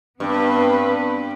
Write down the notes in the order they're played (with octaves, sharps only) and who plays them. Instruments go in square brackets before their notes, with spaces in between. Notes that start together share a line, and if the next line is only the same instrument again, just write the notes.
[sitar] G2 [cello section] B3 C4 B4